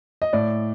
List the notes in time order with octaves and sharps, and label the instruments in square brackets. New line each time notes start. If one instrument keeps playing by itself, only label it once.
[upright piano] D#5
A2 D5